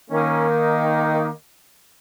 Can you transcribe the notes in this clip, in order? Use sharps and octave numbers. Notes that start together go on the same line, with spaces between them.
D#3 A#3 C#4
D#4